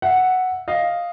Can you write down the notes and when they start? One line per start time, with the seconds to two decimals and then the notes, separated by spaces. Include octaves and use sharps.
0.02 E5 F#5
0.68 D#5 F5